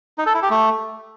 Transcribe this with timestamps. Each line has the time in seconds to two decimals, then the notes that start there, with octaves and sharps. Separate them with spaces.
0.18 D#4
0.26 A4
0.34 E4
0.42 G4
0.50 A3